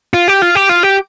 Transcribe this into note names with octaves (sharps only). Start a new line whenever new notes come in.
F4
G4
F4
G4
F4
G4